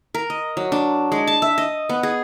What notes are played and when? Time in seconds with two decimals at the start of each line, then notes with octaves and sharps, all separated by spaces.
0.14 A#4
0.30 D#5
0.57 F#3
0.72 D4
1.12 G#3
1.27 A5
1.42 E5
1.58 D#5
1.89 B3
2.03 G#4